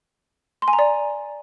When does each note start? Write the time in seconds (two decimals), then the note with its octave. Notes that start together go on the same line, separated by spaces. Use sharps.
0.62 C6
0.68 G#5
0.73 A#5
0.79 D5